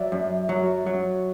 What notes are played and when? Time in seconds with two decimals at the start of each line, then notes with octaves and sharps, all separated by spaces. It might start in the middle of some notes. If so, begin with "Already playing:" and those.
Already playing: F#3 D5 E5
0.12 F#2
0.49 F#3
0.86 F#3